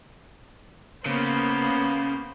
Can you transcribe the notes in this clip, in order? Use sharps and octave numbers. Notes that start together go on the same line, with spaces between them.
C#3 A#3 B3 C5